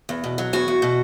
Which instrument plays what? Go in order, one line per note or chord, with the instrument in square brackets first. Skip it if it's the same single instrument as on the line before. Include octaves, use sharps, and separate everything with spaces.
[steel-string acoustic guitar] E2
B2
F#3
E2 F#4
E2
B2